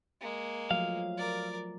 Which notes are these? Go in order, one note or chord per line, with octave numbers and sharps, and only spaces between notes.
G#3 A#3
F3 F#3 A3 F5
A#4 D5